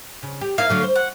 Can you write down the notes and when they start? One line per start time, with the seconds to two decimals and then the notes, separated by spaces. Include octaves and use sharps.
0.23 C#3
0.41 G4
0.58 A#3 D#4 E4 F5
0.69 D3 F#3 A3
0.83 C5
0.96 F#5